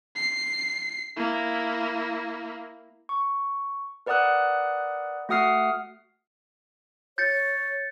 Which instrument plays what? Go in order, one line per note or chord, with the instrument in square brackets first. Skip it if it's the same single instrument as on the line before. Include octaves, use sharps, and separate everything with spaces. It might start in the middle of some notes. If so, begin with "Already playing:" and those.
[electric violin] C7
A#3 E4
[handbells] C#6
A#4 B4 D5 F#5 D#6 F#6
A3 F#4 F#5 D#6 F6 C7
[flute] C#5 [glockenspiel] G6 A6 C#7